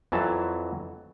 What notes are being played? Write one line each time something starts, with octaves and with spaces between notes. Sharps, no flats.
F2 E3 F#3 A5